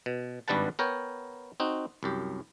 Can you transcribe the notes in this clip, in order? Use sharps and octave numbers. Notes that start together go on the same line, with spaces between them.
B2
G#1 G2 G3 B4 F#5 A5
B3 A#4 C#5 G5
C4 D#4 F#4
C2 F#2 G4